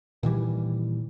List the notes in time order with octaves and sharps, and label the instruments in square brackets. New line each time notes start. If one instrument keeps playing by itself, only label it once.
[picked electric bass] A#2 D#3 E3 G3